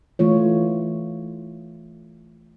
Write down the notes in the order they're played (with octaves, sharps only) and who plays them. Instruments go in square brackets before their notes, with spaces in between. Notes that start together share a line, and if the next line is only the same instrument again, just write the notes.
[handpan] E3 A3 F4 C#5